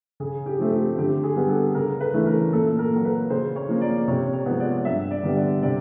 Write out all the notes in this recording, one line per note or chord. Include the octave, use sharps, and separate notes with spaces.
C#3 G#4
G4
F3 A3 C4
G4
D3 G4
G#4
G3 B3
A4
C#3 A#4
B4
E3 A3 C#4
A#4
A#2 A4
A#4
F#3 A#3
B4
C#3 C5
C#5
F3 A#3 C#4
D5
C3 C#5
C#5
F3 G#3 B3
D5
G2 E5
D5
D3 G3 B3
D5
C3 D5